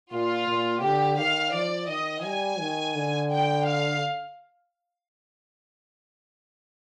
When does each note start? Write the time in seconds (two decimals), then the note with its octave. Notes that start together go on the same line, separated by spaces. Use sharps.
0.12 A#2 F4
0.47 A#2
0.83 D3 G4
1.19 D#3 F5
1.54 F3 D5
1.89 D#3 D#5
2.24 G3 G#5
2.60 D#3
2.95 D3
3.31 G5
3.66 F5